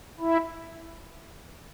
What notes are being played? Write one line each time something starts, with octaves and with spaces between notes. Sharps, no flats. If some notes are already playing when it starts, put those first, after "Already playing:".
E4